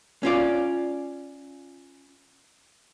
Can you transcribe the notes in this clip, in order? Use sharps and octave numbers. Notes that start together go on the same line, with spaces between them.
C#4 F4 D5